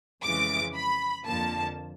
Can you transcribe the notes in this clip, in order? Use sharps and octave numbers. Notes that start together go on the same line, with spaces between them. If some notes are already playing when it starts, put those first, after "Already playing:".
F2 C#3 E3 G#3 D6
B5
F2 D3 F3 A#3 A5